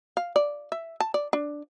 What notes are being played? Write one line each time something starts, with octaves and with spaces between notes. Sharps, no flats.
F5
D5
E5
A5
D5
D4